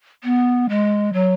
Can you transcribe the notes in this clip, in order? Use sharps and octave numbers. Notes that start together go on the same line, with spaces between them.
B3
G#3
F#3